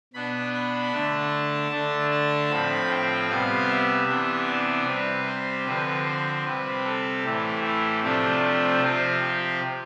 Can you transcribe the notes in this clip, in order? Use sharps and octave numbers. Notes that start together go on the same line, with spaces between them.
B2 B3 D4 B5
B5
D3 A3 D4 A5
D3 A3 D4
A5
A2 F3 C4 B5
G5
C3 G3 B3 F5
E5
C3 E3 B3 D4
D5
C3 G3 C4 B4
C5
D3 F3 C4 B4
C5
C3 G3 C4 B4
A4
A2 E3 A3 G4
G4
C3 F3 A3 D4 G4
G4
C3 F3 C4 F4
G4